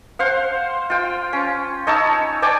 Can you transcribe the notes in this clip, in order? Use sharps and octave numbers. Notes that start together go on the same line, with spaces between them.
C5 F5 F#5
F4 G5
C#4
D#4 C#5 A5 E6
D5 G5 G#5 D6